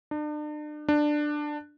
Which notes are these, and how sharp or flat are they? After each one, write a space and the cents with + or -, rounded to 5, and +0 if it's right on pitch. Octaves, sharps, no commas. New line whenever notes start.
D4 +40
D4 +15